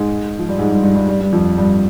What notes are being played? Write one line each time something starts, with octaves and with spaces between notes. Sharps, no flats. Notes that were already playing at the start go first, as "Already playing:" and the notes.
Already playing: G#2 G#3
F3
G3
G#2 G#3
G2 G3
G2 G3
G2 G3
G2 G3
G2 G3
F2 F3
G2 G3